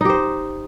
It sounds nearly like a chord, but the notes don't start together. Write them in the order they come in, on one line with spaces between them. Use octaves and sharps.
D#4 G4 C5